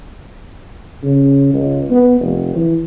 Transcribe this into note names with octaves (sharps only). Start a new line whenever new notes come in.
C#3
C#2
B3
F1
E3